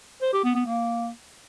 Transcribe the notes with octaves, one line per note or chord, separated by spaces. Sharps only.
C5
G4
B3
B3
A#3